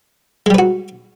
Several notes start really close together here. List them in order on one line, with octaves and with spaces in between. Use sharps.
G#3 G3 B4 F#4